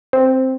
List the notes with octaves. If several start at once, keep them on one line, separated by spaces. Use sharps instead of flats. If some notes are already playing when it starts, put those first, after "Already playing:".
C4